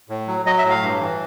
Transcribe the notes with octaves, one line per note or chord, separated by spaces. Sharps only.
A2
F#3
F#3 D#5
E5
A2
F5
G2
E3